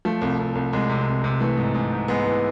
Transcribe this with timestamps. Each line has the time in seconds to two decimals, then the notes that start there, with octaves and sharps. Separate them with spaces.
0.05 F3 A3
0.21 C2
0.39 C2
0.55 C2
0.73 C2 G#3
0.90 C3
1.07 C2
1.24 C3
1.40 E3 A3
1.57 G#2
1.74 G#2
1.92 G#2
2.08 G#2 G#3 B3
2.25 E3